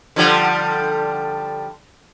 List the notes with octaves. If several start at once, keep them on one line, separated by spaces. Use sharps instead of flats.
D3 F3 G3